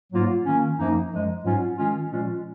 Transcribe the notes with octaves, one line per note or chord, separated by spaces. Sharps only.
G#2 F#3 A#3 F4
D#3 A#3 C#4
F#2 F3 A#3 D#4
F#2 F3 G#3
G#2 F#3 C#4 F4
D#3 G#3 C#4 F4
A#2 F3 G#3 C#4 F4